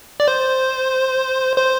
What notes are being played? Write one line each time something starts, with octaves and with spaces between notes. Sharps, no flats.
D5
C5
C5